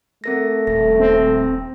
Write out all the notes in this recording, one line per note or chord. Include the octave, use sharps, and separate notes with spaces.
A3 C4 A#4 A#6
D#1 A#6
C4